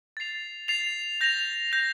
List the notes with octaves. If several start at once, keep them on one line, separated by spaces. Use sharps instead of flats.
A6 C7 F7
A6 C7 F7
G6 A#6 F7
G6 A#6 F7